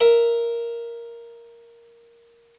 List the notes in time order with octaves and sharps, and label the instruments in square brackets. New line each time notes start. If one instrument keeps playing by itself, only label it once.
[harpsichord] A#4 E5